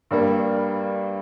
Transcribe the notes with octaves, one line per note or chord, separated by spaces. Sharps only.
G2 G3 A#3